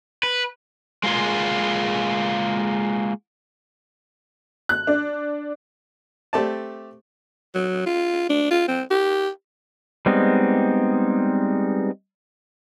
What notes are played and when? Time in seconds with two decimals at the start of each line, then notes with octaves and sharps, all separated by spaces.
0.23 B4
1.03 G#3 A#3 F4 G#4
4.69 F#6
4.87 D4
6.33 A3 C4 G4 D5 A5
7.54 F#3
7.86 F4
8.29 D4
8.51 F4
8.68 C4
8.91 G4
10.06 G3 G#3 B3 C4 D#4